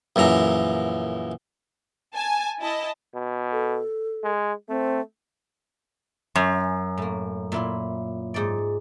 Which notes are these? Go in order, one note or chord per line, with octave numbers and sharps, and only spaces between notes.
A#1 F#2 E3 A#5
G#5 A5
E4 D#5 A5
B2
A4
G#3
A3 C4
F#2 C#4 E5
A2 A#3
A#2 E4 F4
G#2 D5